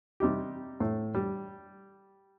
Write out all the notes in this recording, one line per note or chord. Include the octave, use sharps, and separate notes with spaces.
C3 G3 D#4 G4
A2
G3